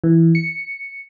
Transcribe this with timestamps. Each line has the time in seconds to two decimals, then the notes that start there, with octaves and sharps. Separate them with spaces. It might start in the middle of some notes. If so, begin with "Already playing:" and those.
0.04 E3
0.35 C#7